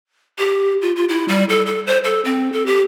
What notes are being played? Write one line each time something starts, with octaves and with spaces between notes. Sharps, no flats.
G4
F4
F4
E4
G3
A4
A4
C5
A4
C4
A4
G4